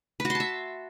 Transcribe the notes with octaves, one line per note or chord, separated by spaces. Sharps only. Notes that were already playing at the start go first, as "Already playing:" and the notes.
B4
F#4
C6
A5
E5